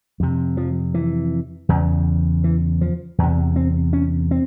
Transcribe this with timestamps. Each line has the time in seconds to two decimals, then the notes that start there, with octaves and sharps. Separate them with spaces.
0.20 F2 C3
0.57 F3
0.94 E3
1.69 E2 C#3
2.44 E3
2.81 F3
3.18 E2 C3
3.56 C4
3.93 C#4
4.31 C4